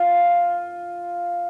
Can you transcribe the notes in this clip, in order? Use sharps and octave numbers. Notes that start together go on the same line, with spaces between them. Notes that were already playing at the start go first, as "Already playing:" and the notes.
Already playing: F4